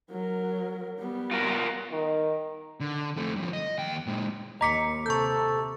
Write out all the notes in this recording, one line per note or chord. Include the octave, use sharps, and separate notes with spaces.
F#3 A#4
G3 B3
F4 F#4 A#4
D#3
D3
F2 A3
G2 F3
D#5
D#2 G5
A#2 G#3
D#2 D#5 A#5 D6 B6 C#7
C3 A4 C#6 G6